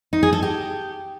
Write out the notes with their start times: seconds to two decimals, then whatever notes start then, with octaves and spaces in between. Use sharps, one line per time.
0.13 D#4
0.23 G#4
0.33 A4
0.43 G4